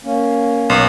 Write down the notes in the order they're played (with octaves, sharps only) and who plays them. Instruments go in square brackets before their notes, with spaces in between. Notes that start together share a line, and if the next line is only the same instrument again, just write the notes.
[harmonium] A#3 C#4
[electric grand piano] B1